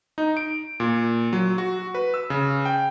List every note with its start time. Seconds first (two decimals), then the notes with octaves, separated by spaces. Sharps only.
0.18 D#4
0.37 D7
0.80 A#2
1.33 F#3
1.58 F#4
1.95 B4
2.14 E6
2.30 C#3
2.65 G5